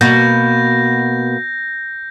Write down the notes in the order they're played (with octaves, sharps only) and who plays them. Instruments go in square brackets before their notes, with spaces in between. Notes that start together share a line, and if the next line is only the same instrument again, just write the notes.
[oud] B2 [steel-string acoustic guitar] A#3 [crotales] G6 A#6